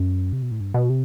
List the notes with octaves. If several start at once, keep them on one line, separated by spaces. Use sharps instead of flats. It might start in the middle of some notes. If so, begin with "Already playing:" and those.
Already playing: F#2
C3
B2
A2
G2
B2
C3